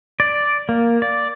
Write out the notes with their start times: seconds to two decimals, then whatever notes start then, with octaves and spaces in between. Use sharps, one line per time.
0.20 D5
0.69 A#3
1.02 D5